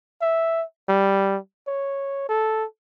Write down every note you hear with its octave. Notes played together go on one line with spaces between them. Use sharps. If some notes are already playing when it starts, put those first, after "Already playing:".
E5
G3
C#5
A4